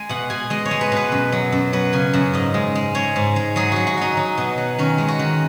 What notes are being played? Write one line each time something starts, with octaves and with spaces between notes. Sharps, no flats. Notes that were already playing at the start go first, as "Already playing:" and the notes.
Already playing: G#3 G#5
B2 F#5
B2 G#5
G#3 D#5
C#5
G#3
B4
B2 B4
F#2
F#3
F#2
F#3 B4
C#3 G#5
F#2 F#5
G#2 D#5
G#3
G#3
G#3 C#5
G#2
G#3
F#3 G#4
F#3 F#4
F#4
F#3 D#4
F#3
B2
F#3
D#3 C#4
G#3
F#4
D#3